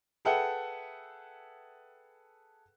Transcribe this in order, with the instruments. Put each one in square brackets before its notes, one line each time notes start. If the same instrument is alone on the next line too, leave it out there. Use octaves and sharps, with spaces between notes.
[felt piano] G#4 A4 B4 E5 F#5 G5